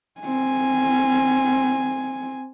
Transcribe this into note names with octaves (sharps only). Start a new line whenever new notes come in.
C4 G#5